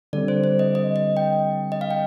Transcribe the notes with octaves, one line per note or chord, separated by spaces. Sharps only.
D3 G3 C4 D5
C5
C5
D#5
D#5
D#5
G5
D#5
F5
G5